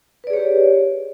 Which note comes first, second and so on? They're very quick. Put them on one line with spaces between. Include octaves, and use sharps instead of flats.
B4 D5 G#4 C#5 G4